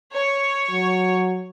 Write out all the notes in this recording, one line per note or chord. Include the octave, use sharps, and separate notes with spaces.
C#5
F#3